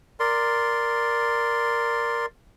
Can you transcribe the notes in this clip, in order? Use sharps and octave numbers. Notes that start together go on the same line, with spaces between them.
A#4 D5 C6